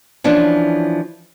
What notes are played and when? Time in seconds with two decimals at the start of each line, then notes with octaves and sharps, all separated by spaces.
0.24 E3 F3 C#4 D4